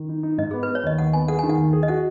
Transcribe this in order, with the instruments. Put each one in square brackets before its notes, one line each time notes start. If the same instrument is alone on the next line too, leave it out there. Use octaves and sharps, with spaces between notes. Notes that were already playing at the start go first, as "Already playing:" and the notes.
Already playing: [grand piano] D#3
D#4
D#4
[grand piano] G#2 [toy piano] D#5
[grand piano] B3 [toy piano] G#4
[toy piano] B4
[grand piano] B3
[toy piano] C#5
[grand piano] D#2 [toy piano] D#5
[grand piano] D#2 [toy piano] F#5
[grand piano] B3 [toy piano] G#5
[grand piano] G#4 [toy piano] F#5
[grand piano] D#3 [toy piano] G#5
[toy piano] F#5
[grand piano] D#2
G#4
[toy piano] D#5
[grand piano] F#4 [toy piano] F#5